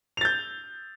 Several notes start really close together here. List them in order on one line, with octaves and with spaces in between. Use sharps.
F7 A6 G6